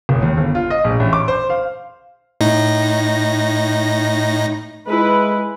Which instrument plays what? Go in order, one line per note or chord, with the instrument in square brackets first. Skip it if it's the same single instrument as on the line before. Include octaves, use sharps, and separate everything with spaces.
[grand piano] F#1
D#2
G1
F4
D#5
A#1
A1
D6
C5
F5
[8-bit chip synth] A2 D#4 A#6
[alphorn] G#3 [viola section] E4 B4